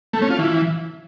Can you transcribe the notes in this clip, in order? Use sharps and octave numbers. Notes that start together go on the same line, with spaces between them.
A3
C#4
F4
E3